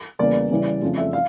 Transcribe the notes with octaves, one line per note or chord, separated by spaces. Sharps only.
E2 C#3 G3 A#3 D5
C#3 E3 G3
F2 C#3 F3 A3
E5
F5